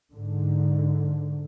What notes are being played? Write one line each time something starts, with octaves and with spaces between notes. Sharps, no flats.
G#2 D3